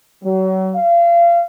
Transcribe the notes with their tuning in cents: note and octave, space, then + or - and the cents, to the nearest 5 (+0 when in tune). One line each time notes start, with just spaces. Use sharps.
F#3 +35
F5 -30